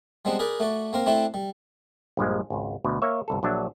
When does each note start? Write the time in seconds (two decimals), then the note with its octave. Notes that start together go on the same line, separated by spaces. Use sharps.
0.25 G3 G#3 B3 C4 D4
0.39 G#4 A#4 B4 D5
0.60 A3 F#4 D5
0.93 A#3 C4 A#4
1.06 A3 C4 D4 E4 A4
1.34 G3
2.17 A#1 G2 F3 G#3
2.50 G#1 C#2
2.84 D2 B2
3.02 A#3 C#5 E5
3.28 G1 C2 A4
3.43 A#1 F#3 D4 E5